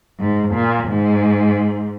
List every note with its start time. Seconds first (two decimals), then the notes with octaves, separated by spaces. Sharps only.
0.19 G#2
0.55 A#2
0.89 G#2